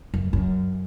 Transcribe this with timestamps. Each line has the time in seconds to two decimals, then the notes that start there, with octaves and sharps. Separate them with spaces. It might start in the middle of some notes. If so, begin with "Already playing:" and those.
0.14 F#2
0.33 F#2